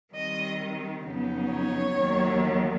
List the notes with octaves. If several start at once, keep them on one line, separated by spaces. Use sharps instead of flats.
D#3 G3 C4 D#5
F2 C#3 F#3 B3 D#4
C#5
D#2 D#3 F#3